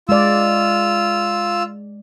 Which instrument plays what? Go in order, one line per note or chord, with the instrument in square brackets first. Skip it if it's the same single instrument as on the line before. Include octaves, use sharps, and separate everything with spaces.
[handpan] G#3 D5 [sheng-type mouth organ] F4 E6